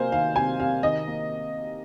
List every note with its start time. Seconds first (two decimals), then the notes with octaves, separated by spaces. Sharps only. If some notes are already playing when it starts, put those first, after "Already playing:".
Already playing: C3 A#3 C5 F5 G#5
0.12 D#3 F5
0.36 C3 G#5
0.60 C3 F5
0.83 D#3 D#5
1.08 A#3